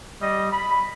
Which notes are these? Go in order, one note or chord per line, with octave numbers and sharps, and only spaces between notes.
G3 D#5
B5